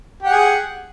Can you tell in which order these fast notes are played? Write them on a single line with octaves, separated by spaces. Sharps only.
G4 F#5 G#4